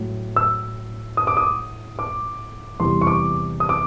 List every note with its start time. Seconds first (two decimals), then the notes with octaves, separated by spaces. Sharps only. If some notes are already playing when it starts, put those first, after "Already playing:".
Already playing: A2 F#3
0.36 E6
1.17 D#6
1.27 D6
1.37 D#6
1.99 D6
2.80 E2 C3 E3 G3 C6
3.01 C#6
3.07 D6
3.60 D#6
3.69 D6